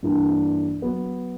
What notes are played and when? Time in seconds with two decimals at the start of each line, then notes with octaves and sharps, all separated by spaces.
0.03 G2 E3 A#3 D4
0.82 F#3 B3 F#4